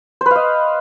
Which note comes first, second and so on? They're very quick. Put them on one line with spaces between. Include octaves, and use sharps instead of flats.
C5 B4 F5 D#5